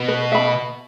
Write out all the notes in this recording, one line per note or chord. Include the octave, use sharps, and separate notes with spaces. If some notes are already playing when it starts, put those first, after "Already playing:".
Already playing: B2
B4
E5 B5